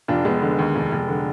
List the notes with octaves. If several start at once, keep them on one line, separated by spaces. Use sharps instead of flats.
F1 D4 F4
F1 G#3 B3
D3
D#2
F1
F1
D3